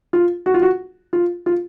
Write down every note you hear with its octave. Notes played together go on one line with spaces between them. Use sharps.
F4
F#4
F4
F#4
F4
F4